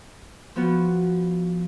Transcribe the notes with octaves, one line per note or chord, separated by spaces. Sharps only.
F3 B3 F#4